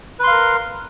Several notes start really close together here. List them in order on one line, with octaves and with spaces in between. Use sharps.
B4 C6 F5 A#4